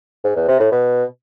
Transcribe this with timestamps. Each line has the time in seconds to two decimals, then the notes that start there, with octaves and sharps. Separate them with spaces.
0.24 G#2
0.36 E2
0.48 C3
0.60 A2
0.72 B2